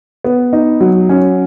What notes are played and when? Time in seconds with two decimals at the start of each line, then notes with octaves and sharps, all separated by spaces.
0.24 B3
0.53 D#4
0.81 F#3
1.09 C#4